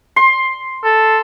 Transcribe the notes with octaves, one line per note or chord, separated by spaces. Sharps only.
C6
A4